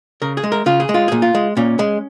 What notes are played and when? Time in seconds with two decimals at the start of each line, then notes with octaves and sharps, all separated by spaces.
0.22 C#3 A#4
0.37 G#4
0.44 G#3
0.52 A#4
0.66 C#3 F4
0.80 G#4
0.89 G#3
0.94 F4
1.08 A#2 G#4
1.22 F4
1.35 G#3
1.57 A#2 C#4
1.79 G#3